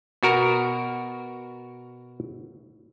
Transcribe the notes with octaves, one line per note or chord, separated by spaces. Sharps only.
B2 F#4 A#4